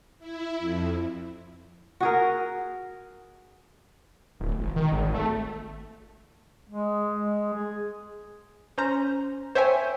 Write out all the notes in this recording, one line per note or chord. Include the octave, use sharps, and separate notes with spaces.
E4
F2
F#4 G#4 A#4
D1
G#1
D#3
G#1
A3
G#3
G#3
G#4
C#4 C5 A#5
C5 C#5 E5 G5 G#5